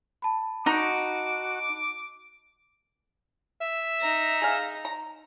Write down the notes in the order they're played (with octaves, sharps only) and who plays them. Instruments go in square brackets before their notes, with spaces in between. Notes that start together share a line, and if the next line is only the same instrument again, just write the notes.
[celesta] A5 B5
[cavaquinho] D#4 [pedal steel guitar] F#4 [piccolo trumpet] D6
[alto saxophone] E5
[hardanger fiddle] D#4 A#5
[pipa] G#4 F5
A#5